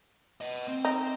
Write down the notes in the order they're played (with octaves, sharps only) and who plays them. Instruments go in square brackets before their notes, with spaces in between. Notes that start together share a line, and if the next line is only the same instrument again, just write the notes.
[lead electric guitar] B4 D#5
C4
[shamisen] D#4